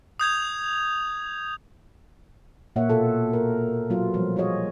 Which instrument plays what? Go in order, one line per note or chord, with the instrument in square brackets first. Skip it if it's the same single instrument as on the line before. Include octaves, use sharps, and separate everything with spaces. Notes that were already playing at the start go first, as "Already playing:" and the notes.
[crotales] D#6 G6 G#6 F7
[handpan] A#2 A#3 C#5 E5 F#5
B2 F4 A4
A#4
F#3 B3 F4
F3 G3
F4 F#4 G#4 C#5 D#5